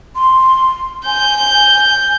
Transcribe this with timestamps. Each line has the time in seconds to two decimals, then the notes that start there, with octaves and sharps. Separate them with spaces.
0.16 C6
1.06 G#5 G6